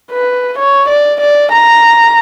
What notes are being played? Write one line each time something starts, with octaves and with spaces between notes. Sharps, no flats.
B4
C#5
D5
D5
A#5